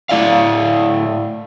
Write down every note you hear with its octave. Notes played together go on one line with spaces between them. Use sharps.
A2 E4 D5 F5